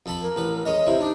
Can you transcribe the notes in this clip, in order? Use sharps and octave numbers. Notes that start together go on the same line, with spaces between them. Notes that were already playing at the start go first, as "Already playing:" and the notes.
F2 A4 B5
A#4
A1 B4
G#3 C#4 D#5
C3 E4 C5
D4 D#4